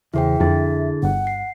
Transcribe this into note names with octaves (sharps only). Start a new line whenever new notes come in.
E2 C#3 E4 G#4 C5 E5 G5
F2 D3 E4 G#4 A6
G1 F#5
C7